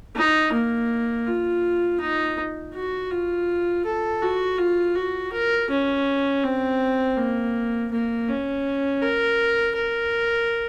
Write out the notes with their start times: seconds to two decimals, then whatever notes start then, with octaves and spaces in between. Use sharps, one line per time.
0.16 D#4
0.53 A#3
1.27 F4
2.00 D#4
2.74 F#4
3.11 F4
3.85 A4
4.22 F#4
4.58 F4
4.96 F#4
5.32 A#4
5.70 C#4
6.44 C4
7.18 A#3
7.92 A#3
8.29 C#4
9.02 A#4
9.76 A#4